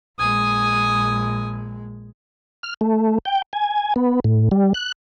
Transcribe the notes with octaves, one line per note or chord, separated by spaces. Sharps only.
A#1 G#3 G#5 D#6
F6
A3
G5
G#5
B3
A2
G3
F#6